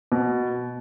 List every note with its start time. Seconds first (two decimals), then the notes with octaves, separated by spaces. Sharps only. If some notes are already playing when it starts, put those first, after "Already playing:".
0.12 B2